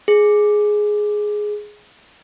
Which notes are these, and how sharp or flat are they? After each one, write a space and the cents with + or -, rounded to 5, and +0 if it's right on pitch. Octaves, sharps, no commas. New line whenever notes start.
G#4 +5